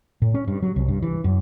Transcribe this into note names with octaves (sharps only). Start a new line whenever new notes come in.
A2
C#4
G2
F#3
C2
G2
E3
F#2